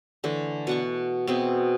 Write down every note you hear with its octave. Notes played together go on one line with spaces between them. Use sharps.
D3 E3 A3
B2 F#5 C#6
B2 C4 G#4 E5